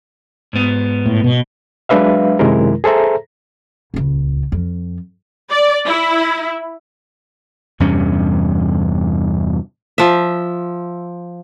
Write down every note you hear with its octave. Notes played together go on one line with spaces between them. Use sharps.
G#2 B3
A2
B2
F#3 G#3 D4 B4 E5 F5
F#2 C3 D#3 G#3 E4 A#4
G#4 A4 C5 E5 A#5
D#1 C#2
F2
D5
E4
E2 G2 C3 C#4
F3 E5